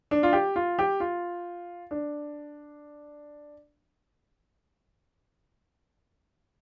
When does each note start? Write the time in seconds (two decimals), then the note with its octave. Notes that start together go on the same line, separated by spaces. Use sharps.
0.11 D4
0.23 F4
0.33 G4
0.56 F4
0.79 G4
1.00 F4
1.91 D4